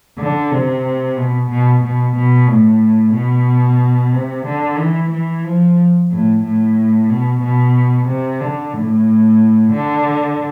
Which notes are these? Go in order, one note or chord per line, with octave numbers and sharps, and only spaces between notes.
D3
C3
B2
B2
B2
B2
A2
B2
C3
D3
E3
E3
F3
A2
A2
B2
B2
C3
D3
A2
D3